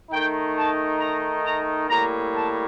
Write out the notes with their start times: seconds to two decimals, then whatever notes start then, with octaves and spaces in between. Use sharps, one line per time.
0.11 D#3 A3 D#4 G5
0.56 A5
1.00 A#5
1.45 A#5
1.89 A2 G3 A#3 A#5
2.34 A5